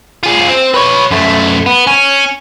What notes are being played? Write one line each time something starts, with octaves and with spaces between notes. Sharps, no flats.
F4 G#4
C4
B4 C#5
F#2 A3
B3
C#4